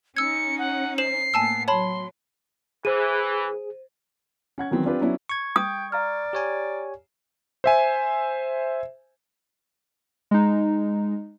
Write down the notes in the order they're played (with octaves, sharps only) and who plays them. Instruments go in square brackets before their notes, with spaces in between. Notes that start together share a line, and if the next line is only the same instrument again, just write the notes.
[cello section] C#4 D#4 [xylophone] E6 G#6 [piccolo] C#7
[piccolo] F#5
[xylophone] C5 E7 F#7 [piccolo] C7
[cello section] A2 A#3 B3 [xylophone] G#5 A5 E6
[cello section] F#3 [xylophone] C#5 A5 B5 [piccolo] C6
[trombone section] E3 [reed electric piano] G#4 [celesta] C5 D#7
[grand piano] C#4 F#5 G#6
D#3 E3 F#3 B3 C4
C4 D4 F4 G4 B4 G5
F#3 B3 C#4 D4 E4
[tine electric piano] C#6 G#6
[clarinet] G5 [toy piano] D#6
[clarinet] D5 [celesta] F5 A#5 F6
[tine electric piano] G4 C#5 G#5
[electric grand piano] C5 E5 G#5
[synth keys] G#3 D#4